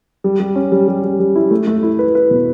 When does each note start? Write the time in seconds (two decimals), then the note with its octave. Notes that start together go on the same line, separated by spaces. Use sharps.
0.24 G3
0.40 G3
0.55 C#4
0.72 G3
0.88 G3
1.04 G3
1.20 G3
1.36 E4
1.51 A3
1.67 A3
1.83 E4
1.99 B4
2.15 B4
2.31 B2